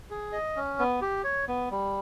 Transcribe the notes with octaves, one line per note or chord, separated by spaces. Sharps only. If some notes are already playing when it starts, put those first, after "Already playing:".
G#4
D#5
C#4
B3
G4
C#5
B3
G3